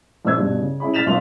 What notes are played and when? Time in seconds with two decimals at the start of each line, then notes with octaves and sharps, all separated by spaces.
0.25 A#1 C5 E6 G#6
0.37 G2 B2
0.60 C#3
0.80 C#4 E4 G#4 B5
0.94 F6 A6 B6 E7 F7
1.06 B1 B2 F4 C6 F7